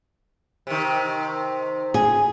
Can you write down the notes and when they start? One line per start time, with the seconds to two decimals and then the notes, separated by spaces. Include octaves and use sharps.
0.67 C3 D#3
1.94 G#4